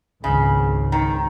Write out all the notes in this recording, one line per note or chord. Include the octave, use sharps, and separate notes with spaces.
G#1 C#2 C#3
D#3